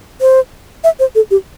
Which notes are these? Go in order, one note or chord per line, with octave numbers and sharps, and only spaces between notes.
C5
E5
C5
A4
G4